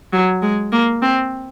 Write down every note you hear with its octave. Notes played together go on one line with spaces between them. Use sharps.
F#3
G#3
A#3
C4